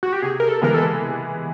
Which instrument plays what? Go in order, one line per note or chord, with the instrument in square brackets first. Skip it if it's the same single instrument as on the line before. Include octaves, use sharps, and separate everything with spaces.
[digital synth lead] F#4
G4
[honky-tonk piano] C3 [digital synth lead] G#4
[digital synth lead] A#4
A4
[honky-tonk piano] E3 G#3 B3 [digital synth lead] A#4
[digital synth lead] A4